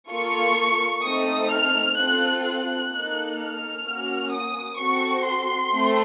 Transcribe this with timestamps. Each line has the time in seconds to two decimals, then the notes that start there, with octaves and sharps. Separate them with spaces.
0.11 A#3 F4 A4 C#6
1.04 A3 C4 D#4 A4 D#6
1.51 F6
1.98 C4 F4 A4 F#6
2.46 F#6
2.91 A#3 D#4 A4
3.39 F6
3.85 A#3 C#4 F#4
4.33 D#6
4.79 C4 F#4 A4 C#6
5.26 C6
5.73 A3 C4